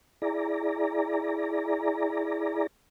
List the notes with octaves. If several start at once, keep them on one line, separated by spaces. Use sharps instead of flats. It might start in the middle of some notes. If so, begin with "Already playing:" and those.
E4 G#4 D5 A#5